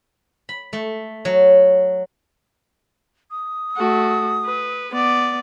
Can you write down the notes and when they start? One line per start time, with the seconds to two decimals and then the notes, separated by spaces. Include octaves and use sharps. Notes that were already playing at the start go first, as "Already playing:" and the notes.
0.49 B5
0.73 A3
1.25 F#3
3.31 D#6
3.77 A3 F#4
4.45 B4
4.91 B3 D5